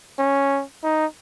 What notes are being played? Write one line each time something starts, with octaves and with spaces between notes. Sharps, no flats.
C#4
D#4